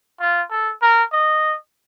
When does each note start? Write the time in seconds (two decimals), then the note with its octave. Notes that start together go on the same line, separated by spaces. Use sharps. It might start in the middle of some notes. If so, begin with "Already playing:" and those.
0.20 F4
0.51 A4
0.82 A#4
1.13 D#5